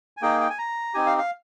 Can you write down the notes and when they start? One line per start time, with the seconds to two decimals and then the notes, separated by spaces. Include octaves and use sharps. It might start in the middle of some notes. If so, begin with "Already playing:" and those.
0.17 G#5
0.22 A#3 D#4 G#4 G5
0.41 G5
0.50 G#5
0.58 A#5
0.94 C4 D#4 G4 G#5
1.06 F5
1.18 F5